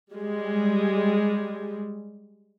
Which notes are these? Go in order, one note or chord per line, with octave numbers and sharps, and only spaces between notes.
G3 G#3